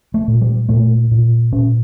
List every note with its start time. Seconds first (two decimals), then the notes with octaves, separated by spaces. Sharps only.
0.14 A3
0.28 A#2
0.41 G3
0.69 A#2 A3
1.11 A#2
1.52 A#2 C#4